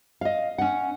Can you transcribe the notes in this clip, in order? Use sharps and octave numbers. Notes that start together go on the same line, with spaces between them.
D#5 F5
C#4 F#5